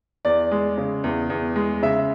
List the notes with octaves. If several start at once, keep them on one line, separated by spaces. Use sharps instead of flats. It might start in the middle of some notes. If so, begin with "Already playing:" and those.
E2 D5
G#3
C#3
E2
E2
G#3
C#3 E5